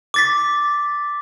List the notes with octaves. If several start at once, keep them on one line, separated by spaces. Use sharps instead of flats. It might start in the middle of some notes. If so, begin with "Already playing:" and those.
D6 A6 B6